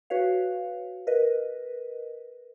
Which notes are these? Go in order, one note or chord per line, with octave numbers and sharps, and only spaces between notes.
F#4 B4 C#5 F5
A#4 B4 D#5